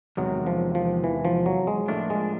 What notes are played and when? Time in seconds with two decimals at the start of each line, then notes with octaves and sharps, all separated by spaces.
0.17 E2 C3 D#3 F#3 G#3
0.47 F3
0.75 F3
1.04 E3
1.25 F3
1.46 F#3
1.67 G#3
1.88 A2 F3 A3 A#3 D4
2.10 G#3